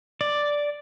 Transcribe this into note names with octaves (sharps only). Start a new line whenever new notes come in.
D5